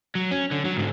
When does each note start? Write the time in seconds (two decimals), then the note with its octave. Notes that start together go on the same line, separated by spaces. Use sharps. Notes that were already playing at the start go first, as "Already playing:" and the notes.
0.15 F#3
0.31 C#4
0.51 D3
0.65 F#3
0.77 G#2 D3